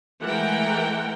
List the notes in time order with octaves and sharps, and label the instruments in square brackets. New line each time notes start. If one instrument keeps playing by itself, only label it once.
[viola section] E3 G#3 A3 A#4 F#5 G5